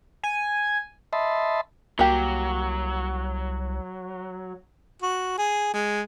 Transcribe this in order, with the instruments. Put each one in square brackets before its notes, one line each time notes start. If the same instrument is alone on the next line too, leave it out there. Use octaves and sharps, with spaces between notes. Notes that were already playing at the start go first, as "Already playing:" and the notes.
[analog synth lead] G#5
[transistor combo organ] D#5 E5 A5 B5 C6
[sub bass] C2 [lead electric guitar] F#3 [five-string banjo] A#3 G4
[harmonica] F#4
G#4
G#3